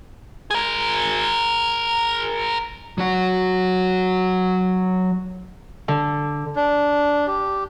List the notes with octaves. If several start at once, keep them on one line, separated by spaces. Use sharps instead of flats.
G#4 A#4
F#3 F#4
D3
D4
G4